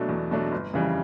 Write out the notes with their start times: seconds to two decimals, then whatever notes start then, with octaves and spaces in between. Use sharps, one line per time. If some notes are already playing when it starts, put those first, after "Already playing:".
Already playing: B2 F#3 A3 D4
0.09 E2
0.31 B2 F#3 A3 D4
0.52 G1
0.74 F2 C#3 E3 G3